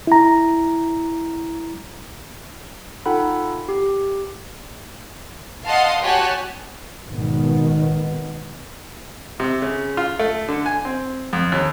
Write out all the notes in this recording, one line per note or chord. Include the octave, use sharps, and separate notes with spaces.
E4 A#5
D#4 F4 A4 F#5 G5 B5
G4
D#5 F5 F#5 A5 C6 D#6
F#4 G4 C#5 G#5 A5 F#6
G#1 B2 D#3 B3
C3
C#3
F4
A3
D3
G#5
C4
F2
D#2